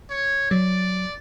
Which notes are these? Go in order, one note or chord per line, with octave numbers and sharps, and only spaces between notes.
C#5
F#3 D5